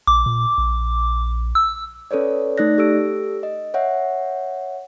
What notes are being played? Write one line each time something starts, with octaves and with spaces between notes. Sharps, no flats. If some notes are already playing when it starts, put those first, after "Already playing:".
A#1 D6
A#2
A#1
E6
C#4 A4 B4 C#5 D5
A3 D#4 D5 F#6 A#6
G4 A4 E6 D7
D#5
C#5 E5 F#5